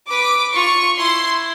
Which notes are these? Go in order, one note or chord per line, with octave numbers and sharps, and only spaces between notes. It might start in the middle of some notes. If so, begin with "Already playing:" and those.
B4 D6
F4 C#6
E4 C6